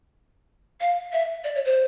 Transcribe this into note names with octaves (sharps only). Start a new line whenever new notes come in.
F5
E5
D5
C#5
C5